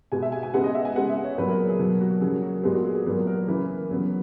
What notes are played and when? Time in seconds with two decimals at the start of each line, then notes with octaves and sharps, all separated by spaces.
0.12 B2 G#3 B3 G#5
0.22 E5
0.32 G#5
0.43 G#5
0.53 C#3 G#3 B3 F#5
0.64 D#5
0.74 E5
0.85 G#5
0.95 C#3 G#3 B3 F#5
1.09 E5
1.24 C#5
1.38 A#2 F#3 B3 B4
1.50 A#4
1.59 G#4
1.69 G#4
1.79 B2 F#3 A#3
2.01 F#4
2.21 C#3 F#3 A#3 G#4
2.43 F#4
2.63 A#2 G#3 B3 G#4
2.75 F#4
2.85 G#4
2.95 G#4
3.06 A#2 F#3 B3 A#4
3.27 A#4
3.48 C#3 E3 A#3 B4
3.90 C#3 F#3 B3